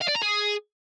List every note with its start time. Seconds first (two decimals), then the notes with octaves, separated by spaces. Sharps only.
0.01 F5
0.08 D5
0.15 A#5
0.22 G#4